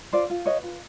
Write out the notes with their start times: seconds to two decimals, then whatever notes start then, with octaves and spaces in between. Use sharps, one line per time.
0.13 F4 C5 D5
0.30 F4
0.46 B4 C#5 D#5
0.63 F4